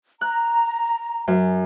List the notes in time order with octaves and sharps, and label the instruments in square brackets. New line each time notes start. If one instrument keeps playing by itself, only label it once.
[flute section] A#5 [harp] F#6
[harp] F#2